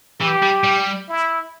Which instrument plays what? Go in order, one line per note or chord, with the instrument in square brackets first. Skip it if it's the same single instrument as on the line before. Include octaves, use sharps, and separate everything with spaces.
[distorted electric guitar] E3 [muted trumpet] G4
[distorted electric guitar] G3
G3
[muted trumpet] E4